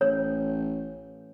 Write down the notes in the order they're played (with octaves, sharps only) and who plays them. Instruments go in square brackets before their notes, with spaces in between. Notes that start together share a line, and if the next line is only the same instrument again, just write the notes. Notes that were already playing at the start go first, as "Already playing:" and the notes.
[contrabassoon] A1 [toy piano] C#5